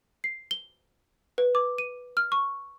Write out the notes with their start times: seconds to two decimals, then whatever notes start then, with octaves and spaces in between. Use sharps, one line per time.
0.24 C7
0.51 G7
1.38 B4
1.55 D6
1.78 D#7
2.17 F6
2.32 C#6